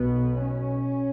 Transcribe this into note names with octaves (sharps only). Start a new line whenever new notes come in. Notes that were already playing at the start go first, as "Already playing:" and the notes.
Already playing: B1 B2 B3
C#4